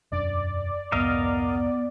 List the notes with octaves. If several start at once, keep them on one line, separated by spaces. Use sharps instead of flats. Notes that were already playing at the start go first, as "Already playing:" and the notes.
E1 F#2 D4 D5
C2 F2 G#2 B3 A#4 D#5 F5